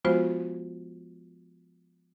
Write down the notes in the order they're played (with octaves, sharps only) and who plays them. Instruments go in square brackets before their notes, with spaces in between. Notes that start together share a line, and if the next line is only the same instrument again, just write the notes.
[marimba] F3 G#3 B3 F4 F#4 C5